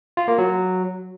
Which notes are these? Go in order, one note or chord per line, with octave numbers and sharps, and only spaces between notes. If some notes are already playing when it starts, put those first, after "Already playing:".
F4
A#3
F#3